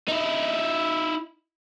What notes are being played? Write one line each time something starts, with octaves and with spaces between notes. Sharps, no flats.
D#4 E4